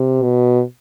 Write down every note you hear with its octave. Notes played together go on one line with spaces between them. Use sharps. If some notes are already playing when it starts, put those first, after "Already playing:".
Already playing: C3
B2